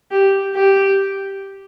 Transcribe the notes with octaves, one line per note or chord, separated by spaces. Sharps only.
G4
G4